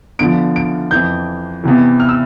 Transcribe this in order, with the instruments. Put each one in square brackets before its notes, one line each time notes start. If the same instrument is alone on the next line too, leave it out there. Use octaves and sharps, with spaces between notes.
[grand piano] E2 D3 F3 D7
D7
F2 E3 G6
E2 C3 E3
F6
E6